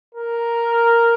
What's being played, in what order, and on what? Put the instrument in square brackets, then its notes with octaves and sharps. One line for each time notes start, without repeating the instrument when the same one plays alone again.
[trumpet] A#4